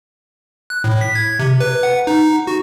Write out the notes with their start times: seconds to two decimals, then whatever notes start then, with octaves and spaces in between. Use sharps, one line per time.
0.70 F#6
0.84 A2
1.01 B6
1.15 G#6
1.39 C3
1.60 B4
1.83 F#5
2.07 D#4
2.47 F#4